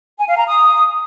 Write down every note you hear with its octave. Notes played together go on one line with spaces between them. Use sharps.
G#5
F5
A#5
D#6